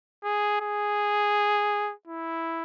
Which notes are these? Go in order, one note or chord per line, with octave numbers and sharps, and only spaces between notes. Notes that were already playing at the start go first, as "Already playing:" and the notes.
G#4
G#4
E4